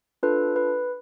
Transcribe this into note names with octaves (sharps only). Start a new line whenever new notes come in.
D4 F4 A4 B4
B4